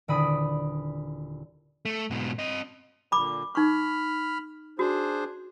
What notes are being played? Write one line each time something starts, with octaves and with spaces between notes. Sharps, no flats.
D#1 D3 E4 D5 B5 D#6
A3
G#2 B2
C4 D#5
A#2 D3 B5 D6
D#4 B5 C#6 F6
D4 F#4 G#4 C5